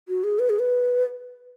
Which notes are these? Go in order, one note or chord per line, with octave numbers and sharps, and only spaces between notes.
F#4
G#4
B4
G#4
B4